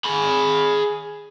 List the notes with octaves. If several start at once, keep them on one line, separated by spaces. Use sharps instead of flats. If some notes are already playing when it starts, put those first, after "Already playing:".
G#4 B5